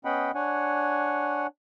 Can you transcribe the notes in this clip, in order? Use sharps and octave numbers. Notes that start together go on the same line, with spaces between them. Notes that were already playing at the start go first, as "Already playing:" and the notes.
B3 C#4 D#5 F#5 G5 B5
D4 C#5 F#5 G#5